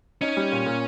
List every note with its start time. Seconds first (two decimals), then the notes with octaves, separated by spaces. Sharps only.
0.21 C#4 D#4
0.37 G3
0.52 A#2
0.66 A#2